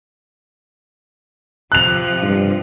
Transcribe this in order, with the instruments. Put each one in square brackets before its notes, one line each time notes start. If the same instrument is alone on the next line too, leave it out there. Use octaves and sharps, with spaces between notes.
[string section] C3 F3 [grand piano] F#6 F7
[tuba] G2